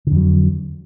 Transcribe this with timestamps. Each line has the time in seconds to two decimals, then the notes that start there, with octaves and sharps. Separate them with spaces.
0.07 D3
0.12 F2
0.16 F#3